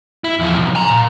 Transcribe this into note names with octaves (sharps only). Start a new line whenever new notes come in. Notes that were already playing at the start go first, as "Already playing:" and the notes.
E4
E2 F3
B1
G#5 A#5
A#2